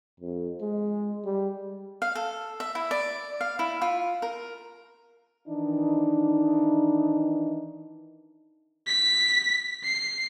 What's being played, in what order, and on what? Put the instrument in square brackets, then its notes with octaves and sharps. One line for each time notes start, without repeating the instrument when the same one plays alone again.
[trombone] F2
G#3
G3
[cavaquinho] F5
A4
E5
E4
D5
F5
E4
F4
A#4
[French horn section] D#3 E3 D4 D#4
[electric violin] B6
C7